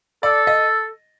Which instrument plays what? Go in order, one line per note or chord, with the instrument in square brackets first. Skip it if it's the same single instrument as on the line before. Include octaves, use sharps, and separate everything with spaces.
[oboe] A4 [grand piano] D5
[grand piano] D#5